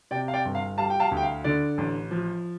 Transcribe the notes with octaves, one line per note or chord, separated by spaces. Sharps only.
C3 D5 G5
F5
D5 G5
G1
F5
G3 F5 A5
G5
F5 A5
D2
G5
F5
D3 D5
A1
F3